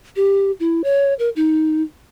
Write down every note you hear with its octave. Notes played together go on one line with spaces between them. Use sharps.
G4
E4
C#5
A#4
D#4